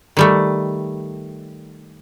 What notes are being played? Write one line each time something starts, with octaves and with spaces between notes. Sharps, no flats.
D#3 G3 A3